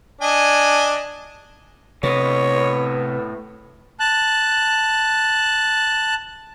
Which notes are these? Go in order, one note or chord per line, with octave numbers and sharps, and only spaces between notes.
D4 D#5 G#5
A2 C3 B3 C#5 D#5
A5 F#6